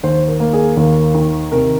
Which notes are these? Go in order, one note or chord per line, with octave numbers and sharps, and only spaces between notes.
D#2 C5
A#4
A#3
G#4
D#2 A#4
D#3
C3 A#4